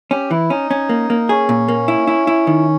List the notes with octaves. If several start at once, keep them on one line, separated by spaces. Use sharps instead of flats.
C#4 G4
E3 E4
C#4 D#4
C#4
A#3
A#3
C#4 G#4
A#2
A#3
E4
E4
E4
D#3